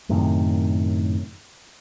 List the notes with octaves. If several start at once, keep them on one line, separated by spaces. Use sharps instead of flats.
F#2 A2 C3 D#3